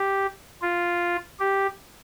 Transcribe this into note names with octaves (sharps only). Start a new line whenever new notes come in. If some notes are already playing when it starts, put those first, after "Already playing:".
Already playing: G4
F4
G4